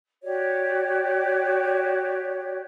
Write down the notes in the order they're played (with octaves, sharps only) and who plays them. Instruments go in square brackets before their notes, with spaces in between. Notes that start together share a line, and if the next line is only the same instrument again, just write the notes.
[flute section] F#4 G4 C#5 D5